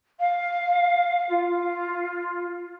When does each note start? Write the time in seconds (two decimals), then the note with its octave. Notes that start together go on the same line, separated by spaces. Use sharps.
0.19 F5
1.28 F4